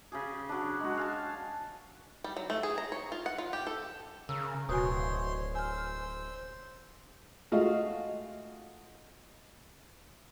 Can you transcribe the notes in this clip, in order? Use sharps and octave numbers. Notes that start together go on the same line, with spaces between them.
C#3 G4 G#4
F#3 D4
G#3 F#4
F5 G#5 A5
G3
F#3
A3
G#4
A#5
C#5
F4
F#5
F4
G4
A4
C#3 A#4 E6
D1 B2 F#4 C5 C#5 G#5 C6
C5 G#5 E6 F6
G#3 A3 F4 F#4 D#5 F5